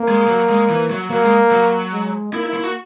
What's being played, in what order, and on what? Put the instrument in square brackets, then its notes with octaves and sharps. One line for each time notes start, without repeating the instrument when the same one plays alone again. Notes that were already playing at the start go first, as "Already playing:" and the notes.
Already playing: [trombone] A#3
[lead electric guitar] G#3
F#3
G#3
E3
F#3
[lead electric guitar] F#3 [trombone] A#3
[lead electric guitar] G#3
F#3
[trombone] G#3
[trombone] A#3 [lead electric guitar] E4
[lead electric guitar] E4
E4
F#4